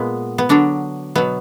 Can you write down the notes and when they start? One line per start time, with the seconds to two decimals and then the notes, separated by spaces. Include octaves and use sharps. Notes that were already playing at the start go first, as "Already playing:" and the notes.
Already playing: A#2 G#3 B3
0.38 B3
0.49 D3 F#3 D4
1.15 B2 F#3 B3